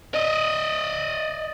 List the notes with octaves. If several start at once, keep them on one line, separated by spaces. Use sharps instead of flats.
D5 D#5